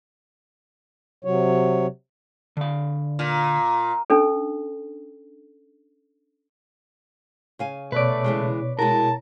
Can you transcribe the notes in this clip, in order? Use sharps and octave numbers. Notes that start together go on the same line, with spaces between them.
C3 F#3 C#5
D3 F5
A#2
C#4 D4 A4
C#3 F5 G#5
B2 A3 B4 C#5 D5
C#3 E3 G#3
G#3 E4 F#4 A#4 A5